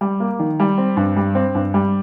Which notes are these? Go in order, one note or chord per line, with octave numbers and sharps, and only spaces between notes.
G3
A#3
D#3
G3
C4
G2
G3
C4
G2
G3